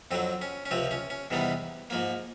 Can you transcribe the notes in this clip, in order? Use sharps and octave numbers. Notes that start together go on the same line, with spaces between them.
F2 D3 F#3 C4
C#4
C#4
C#2 C3 F3 C4
C#4
C#4
E2 C3 D#3 G3 B3
G#2 F3 A#3